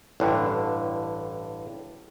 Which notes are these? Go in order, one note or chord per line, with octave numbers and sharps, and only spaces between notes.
A1 G2 D3